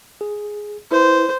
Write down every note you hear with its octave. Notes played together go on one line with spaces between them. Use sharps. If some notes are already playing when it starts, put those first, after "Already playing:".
G#4
E4 B4 C5